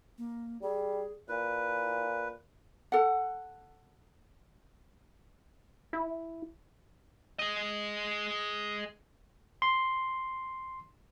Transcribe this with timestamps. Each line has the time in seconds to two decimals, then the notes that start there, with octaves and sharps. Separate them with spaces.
0.18 A#3
0.62 G3 G#4
1.29 A#2 E4 B4
2.92 A4 F#5
5.93 E4
7.39 G#4 D#5
9.62 C6